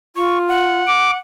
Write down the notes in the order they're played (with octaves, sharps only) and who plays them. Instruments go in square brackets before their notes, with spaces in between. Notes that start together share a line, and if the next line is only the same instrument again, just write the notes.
[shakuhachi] F4 [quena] C#6
[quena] F#5
[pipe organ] D6